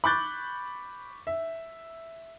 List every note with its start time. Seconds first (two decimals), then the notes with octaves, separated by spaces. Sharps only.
0.04 B5 C#6 D6 F#6 G6 A6
1.27 E5